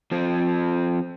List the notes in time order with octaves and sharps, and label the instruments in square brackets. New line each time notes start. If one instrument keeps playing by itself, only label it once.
[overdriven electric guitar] F3 C4